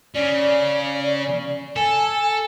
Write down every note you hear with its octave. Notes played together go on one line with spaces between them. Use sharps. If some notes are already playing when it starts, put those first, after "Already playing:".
C#3 D5
A4 G#5